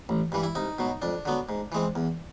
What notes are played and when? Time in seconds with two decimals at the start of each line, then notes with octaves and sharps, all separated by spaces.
0.09 A1
0.32 G2 E3 G3
0.43 E4
0.55 C2 D#4
0.79 B2 F#3
1.02 F2 D4
1.25 D3 F#3 B3
1.49 G#2
1.72 E3 G#3 C4
1.95 E2